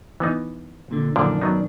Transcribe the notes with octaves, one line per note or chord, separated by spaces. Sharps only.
E3 B3 D#4
A#2 D3
F#2 A#2 D3 D#3 F3 D4
F#3 B3 D#4